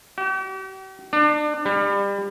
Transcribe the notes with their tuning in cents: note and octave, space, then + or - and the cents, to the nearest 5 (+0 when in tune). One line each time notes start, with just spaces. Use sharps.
G4 -45
D4 +30
G3 +30